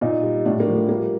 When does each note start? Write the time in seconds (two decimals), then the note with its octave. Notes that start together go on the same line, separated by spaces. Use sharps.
0.01 A#2 D#4
0.23 G3
0.46 A2 D4
0.60 A#3
0.68 F3
0.75 A3
0.89 G3 A#3